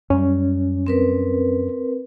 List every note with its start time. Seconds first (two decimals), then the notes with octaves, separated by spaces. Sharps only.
0.10 F#2 G3 C#4
0.87 C4 A#4 B4